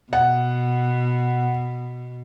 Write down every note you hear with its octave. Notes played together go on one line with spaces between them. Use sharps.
B2 F#5